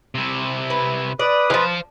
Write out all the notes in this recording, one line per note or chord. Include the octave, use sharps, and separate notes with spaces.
C3 E4
B4
B4 D5 D#6
E3 F3 C5 F5